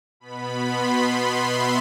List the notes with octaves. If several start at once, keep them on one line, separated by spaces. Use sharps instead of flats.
B2 B3 B5
C6
C6
E5